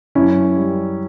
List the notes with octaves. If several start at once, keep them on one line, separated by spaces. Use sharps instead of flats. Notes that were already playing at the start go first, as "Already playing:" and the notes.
F#2 C#4 E4
G3